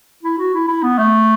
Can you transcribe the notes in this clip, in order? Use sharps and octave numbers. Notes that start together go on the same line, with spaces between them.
E4
F#4
E4
E4
B3
A3